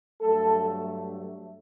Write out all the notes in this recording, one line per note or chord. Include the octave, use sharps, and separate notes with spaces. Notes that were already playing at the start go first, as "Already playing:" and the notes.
G2 F#3 A3 A4